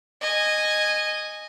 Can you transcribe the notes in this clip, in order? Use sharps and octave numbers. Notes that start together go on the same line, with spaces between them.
D#5 G#5